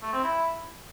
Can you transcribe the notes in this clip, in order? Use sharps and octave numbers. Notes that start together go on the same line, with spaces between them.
A3
C4
E4